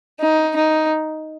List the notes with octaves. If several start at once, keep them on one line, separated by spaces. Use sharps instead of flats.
D#4
D#4